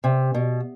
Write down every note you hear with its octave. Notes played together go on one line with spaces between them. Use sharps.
C3
B2